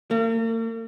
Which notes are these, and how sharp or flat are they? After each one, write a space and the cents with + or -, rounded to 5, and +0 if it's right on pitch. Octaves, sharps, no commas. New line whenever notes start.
A#3 -45